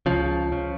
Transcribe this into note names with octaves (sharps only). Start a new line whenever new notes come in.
C#2 C#3 F3
C#3